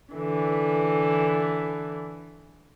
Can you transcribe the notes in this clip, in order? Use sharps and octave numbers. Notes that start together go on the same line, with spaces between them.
D3 E3